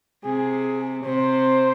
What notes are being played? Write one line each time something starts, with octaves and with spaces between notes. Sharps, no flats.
C3 G#4
C3 C5